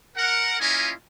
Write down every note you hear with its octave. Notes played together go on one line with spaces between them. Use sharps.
A#4 F#5
A#3 C#4 E4 F4 D#5 G#5